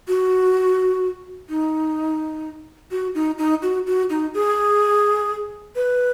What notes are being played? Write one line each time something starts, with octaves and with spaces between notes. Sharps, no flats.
F#4
D#4
F#4
D#4
D#4
F#4
F#4
D#4
G#4
B4